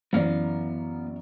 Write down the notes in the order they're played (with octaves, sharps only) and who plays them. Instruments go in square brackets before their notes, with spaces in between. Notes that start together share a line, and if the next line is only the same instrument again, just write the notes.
[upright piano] F#2 E3 D5 [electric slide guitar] B3 F5